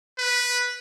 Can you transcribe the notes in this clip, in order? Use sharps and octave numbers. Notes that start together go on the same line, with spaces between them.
B4